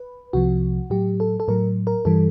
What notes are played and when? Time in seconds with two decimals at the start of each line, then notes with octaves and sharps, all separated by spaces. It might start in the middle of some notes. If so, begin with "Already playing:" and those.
Already playing: B4
0.33 C2 C3 F3 F#4
0.90 A2 F#3 G4
1.20 A4
1.40 A4
1.48 A2 F#3 A#4
1.87 A#4
2.05 G2 E3 G3 A4